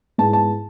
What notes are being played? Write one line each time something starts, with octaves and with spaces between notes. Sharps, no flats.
G#2 G#3 B3 E4 A5
A5